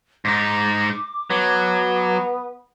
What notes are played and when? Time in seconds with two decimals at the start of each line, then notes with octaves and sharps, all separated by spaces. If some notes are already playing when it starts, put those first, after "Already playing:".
0.25 G#2 D#4 D6
1.30 F#3 B3